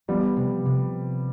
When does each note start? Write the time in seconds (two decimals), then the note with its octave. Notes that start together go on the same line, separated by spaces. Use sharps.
0.08 F3 G3 B3
0.36 C3
0.66 C3